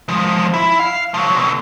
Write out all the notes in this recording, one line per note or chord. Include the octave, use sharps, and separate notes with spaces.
F3 G#3
E4
F5
F3 F#3
B2 D3